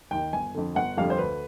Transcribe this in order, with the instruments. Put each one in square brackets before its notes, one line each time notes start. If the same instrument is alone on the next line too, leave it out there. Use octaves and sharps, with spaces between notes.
[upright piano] D#2 D#3 G5
G1 G#5
F2 D3
G1 F#5
F2 D3 G3 F5
C5
D2 B4